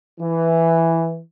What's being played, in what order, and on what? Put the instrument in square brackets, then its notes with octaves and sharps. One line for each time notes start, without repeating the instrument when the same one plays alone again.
[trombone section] E3